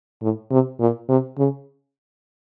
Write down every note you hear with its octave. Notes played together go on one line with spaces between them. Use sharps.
A2
C3
A#2
C3
C#3